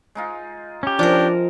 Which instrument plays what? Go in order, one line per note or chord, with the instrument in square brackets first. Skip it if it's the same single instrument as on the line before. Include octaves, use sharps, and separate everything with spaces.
[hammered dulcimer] G#3 D#4 F4
[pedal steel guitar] C#4 G4
[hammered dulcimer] C3 [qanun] F3 A#4 [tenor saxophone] D4